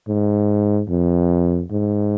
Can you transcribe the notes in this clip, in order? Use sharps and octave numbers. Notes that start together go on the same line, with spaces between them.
G#2
F2
G#2